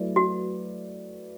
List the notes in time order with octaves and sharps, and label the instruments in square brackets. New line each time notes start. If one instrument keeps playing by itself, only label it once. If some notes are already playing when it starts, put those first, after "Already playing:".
Already playing: [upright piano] F#3 A3 E4 B4 D5
[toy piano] F#4